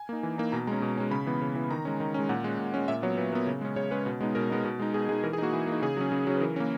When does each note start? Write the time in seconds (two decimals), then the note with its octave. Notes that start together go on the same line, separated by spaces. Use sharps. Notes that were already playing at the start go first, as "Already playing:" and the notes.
Already playing: G#5
0.09 A#3 D#4
0.23 E3
0.38 A#3 D#4
0.52 B2 A#5
0.67 G#3 C#4 A#5
0.82 B2
0.97 G#3 C#4
1.11 C#3 B5
1.27 E3 B3
1.41 C#3
1.55 E3 B3
1.71 D#3 A#5
1.85 G#3 C#4
2.00 D#3
2.14 G#3 C#4
2.29 A#2 F#5
2.44 G#3 C#4
2.59 A#2
2.74 G#3 C#4
2.88 A#2 E5
3.02 F#3 B3 C#5
3.17 A#2 B4
3.32 F#3 B3 A#4
3.47 C#3
3.61 G#3 C#4
3.76 C#3 C#5
3.91 G#3 C#4 B4
4.06 B2
4.21 G#3 B3 D#4
4.35 B2 A#4
4.50 G#3 B3 D#4
4.65 B2
4.80 G#3 D#4
4.94 B2 G#4
5.09 G#3 G#4
5.12 D#4
5.24 E3 A#4
5.33 G#4
5.38 A#3 D#4 F#4
5.53 E3 E4
5.67 A#3 D#4
5.82 C#3 G#4
5.97 F#3 C#4
6.12 C#3
6.27 F#3 C#4
6.36 B4
6.41 E3 A#4
6.56 A#3 C#4